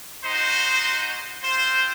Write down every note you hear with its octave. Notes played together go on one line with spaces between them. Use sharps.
G#3 D#4 F#4 C5
C4 F4 C5